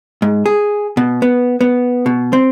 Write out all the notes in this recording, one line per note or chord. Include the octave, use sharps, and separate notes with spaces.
G#2
G#4
B2
B3
B3
B2
C4